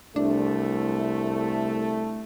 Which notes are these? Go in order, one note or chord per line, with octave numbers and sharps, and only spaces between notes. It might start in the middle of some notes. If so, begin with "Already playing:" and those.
C2 A3 D4